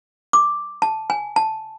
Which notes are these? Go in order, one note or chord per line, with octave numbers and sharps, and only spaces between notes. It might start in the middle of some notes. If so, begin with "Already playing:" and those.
D6
A5
G#5
A5